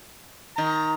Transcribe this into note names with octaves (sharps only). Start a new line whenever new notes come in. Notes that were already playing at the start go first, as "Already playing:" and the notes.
D#3 A#5